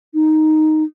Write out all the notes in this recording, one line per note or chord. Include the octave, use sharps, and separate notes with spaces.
D#4